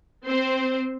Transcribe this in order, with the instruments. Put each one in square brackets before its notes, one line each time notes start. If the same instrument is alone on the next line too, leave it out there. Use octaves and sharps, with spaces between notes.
[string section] C4 C5